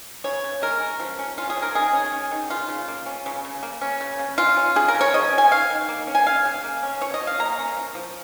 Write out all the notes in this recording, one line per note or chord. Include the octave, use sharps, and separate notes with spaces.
C#3 C#5
C#3
G#3 A#4
C#4
F3
C#4
C#4 F4
G#4
F3
A#4
D#3 G#4
C#4
C#4
D#3
C#3 F4
C#3
A#3
C#4
C#3
C#3
A#3
C#4
C#3
C#3
G#3 F4
C#4
C#3 G#4
A#4
C#3
C#5
F3 D#5
C#4
G#5
D#3 F5
D#3
A#3
C#4
G#5
C#3 F5
C#3
A#3
C#4
F3 C#5
D#5
F3
F5
A#3 A#5
C#4
F3
F3